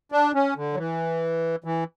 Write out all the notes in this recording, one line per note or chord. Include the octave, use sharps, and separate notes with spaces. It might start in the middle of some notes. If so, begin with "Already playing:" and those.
D4
C#4
D3
F#3
E3
E3